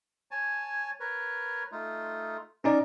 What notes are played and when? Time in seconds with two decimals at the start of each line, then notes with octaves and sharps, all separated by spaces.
0.31 C#5 G#5 A5
1.00 A#4 B4 C#5
1.72 A3 D#4 F4
2.64 C#4 D#4 A#4 D5 D6